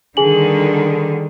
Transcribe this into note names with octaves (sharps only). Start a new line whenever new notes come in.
D3 D#3 G3 G#4 G#5 F#7